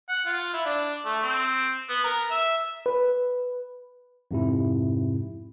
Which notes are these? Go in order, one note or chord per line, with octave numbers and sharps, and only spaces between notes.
F#5
F4
E4
D4
A3
C4
B3
A#4
E5
B4
F2 G#2 C3 E4